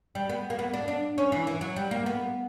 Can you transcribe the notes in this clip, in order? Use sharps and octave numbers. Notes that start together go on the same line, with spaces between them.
G3
B3
A#3
B3
D4
D4
C#4
E3
E3
F#3
G3
A#3
B3